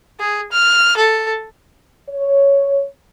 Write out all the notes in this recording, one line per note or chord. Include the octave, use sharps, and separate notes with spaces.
G#4
F6
A4
C#5